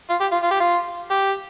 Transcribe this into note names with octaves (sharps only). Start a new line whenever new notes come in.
F4
G4
F4
F4
G4
F4
G4